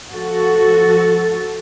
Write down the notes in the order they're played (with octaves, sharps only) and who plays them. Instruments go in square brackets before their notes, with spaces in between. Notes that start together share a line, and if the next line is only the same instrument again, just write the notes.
[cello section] F3 F#4 A4